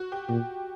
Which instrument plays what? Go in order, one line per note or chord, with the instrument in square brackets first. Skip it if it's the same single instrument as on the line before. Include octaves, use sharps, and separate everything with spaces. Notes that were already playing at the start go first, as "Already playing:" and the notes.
Already playing: [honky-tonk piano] F#4
G4
[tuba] A#2 [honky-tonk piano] G4